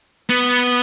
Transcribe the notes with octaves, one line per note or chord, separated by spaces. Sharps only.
B3